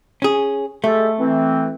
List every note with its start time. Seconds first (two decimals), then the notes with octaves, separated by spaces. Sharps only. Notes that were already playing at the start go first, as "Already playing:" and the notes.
0.22 C#4 G#4
0.84 G#3 A3 G4 A4
1.19 E3 C4